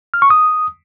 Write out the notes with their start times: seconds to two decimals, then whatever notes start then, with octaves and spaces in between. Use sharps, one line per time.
0.14 F6
0.22 C#6
0.30 D#6